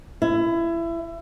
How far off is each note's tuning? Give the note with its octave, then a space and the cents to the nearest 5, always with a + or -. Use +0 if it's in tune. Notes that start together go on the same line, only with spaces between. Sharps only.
E4 +25